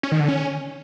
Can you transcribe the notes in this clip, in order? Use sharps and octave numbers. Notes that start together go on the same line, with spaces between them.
C#4
D#3
D3
C#4